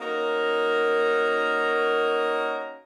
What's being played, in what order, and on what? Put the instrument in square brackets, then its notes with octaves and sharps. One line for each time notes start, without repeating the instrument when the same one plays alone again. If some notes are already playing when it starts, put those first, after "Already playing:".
[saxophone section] A#3 C#4 D#4 F#4 A#4